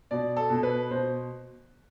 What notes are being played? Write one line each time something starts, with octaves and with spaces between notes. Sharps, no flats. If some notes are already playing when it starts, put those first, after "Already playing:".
B2 D5
A4
B2
B4
B2 C5